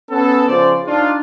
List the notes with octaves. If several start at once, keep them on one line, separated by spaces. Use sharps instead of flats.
B3 C#4 A4
C#3 F3 C5 D5
D4 D#4 F4